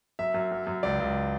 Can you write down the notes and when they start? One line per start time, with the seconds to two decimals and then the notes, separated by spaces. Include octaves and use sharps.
0.19 F#2 E5
0.34 F#2
0.52 F#2
0.67 F#2
0.83 C#2 D5
1.00 C#2